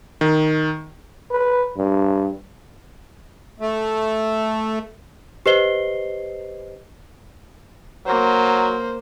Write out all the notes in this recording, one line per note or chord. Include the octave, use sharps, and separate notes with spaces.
D#3
B4
G2
A3
G4 B4 C5 D#5 C7 G7
F#3 A#3 C5